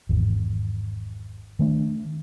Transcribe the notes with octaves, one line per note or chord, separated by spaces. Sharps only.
G#1 E2
D#3 A3 D4